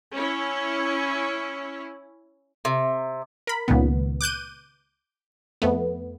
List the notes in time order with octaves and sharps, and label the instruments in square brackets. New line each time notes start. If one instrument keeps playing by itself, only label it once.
[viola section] C#4 E4
[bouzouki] C3
[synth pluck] A#4 B5
C#2 A#2 D#3 B3
D6 F#6 G6 D#7
F2 A3 B3